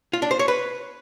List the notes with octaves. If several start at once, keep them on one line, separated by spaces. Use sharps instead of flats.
F4
D4
C5
C#5
B4